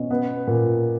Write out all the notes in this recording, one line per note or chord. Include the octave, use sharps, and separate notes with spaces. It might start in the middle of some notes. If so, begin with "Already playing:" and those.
Already playing: B2 C#4
B3
A#2